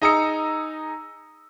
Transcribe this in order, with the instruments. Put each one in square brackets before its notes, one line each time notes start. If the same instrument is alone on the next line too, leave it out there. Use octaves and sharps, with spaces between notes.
[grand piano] D#4 G#4 A#5 D#6 E6 C#7